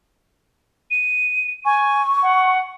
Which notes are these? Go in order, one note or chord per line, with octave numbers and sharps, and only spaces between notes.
D#7
G#5 C#6
F#5